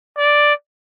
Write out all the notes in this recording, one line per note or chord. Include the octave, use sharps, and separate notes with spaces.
D5